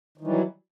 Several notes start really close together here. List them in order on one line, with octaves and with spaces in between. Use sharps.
D#3 E3 G3 F#3